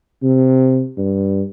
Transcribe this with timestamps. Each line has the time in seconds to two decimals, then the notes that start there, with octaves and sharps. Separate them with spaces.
0.23 C3
0.97 G2